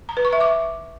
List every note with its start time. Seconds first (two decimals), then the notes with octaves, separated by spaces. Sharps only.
0.09 A#5
0.17 B4
0.25 C#6
0.33 E5
0.41 D6